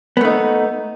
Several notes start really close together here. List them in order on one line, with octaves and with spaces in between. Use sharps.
B3 A3 D#4